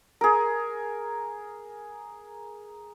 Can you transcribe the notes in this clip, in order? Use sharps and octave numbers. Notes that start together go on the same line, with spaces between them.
G#4 A#4